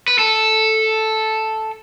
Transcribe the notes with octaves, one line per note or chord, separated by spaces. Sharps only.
B4
A4